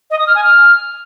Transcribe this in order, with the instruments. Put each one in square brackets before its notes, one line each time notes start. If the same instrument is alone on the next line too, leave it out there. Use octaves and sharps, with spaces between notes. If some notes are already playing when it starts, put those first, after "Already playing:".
[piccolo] D#5
D#6
F6
G#5
F6